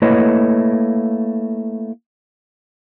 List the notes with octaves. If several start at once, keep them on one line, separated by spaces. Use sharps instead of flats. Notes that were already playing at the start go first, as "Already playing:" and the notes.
A3 A#3 E4 B4 C#5 D#5